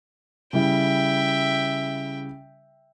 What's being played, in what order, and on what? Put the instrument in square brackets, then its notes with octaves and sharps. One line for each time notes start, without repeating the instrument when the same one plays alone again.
[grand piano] C#3 G3 E4 [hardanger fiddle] E5 G5